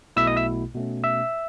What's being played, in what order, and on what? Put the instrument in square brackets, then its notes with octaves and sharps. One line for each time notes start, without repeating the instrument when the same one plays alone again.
[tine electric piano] B1 B2 A3 E4 E5 E6
D#5 D#6
E5 E6
B2 A3 C#4
E5 E6